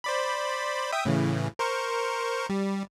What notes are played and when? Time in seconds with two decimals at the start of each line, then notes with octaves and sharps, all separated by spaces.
0.04 C5 D5 B5
0.92 E5 G5 D#6
1.05 A2 C#3 E3
1.59 A#4 C5 C#6
2.49 G3